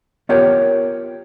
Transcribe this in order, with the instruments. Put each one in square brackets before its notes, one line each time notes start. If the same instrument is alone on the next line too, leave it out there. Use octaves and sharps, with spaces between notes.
[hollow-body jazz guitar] B3 F4 G4 A#4 C#5 G5